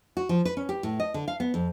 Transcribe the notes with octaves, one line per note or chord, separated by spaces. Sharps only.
F#4
F3
B4
C#4
G4
A2
D#5
D3
F5
B3
F2